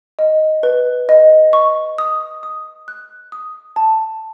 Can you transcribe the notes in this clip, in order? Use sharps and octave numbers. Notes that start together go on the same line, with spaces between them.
D#5
B4
D#5
C#6
D#6
D#6
F#6
D#6
A5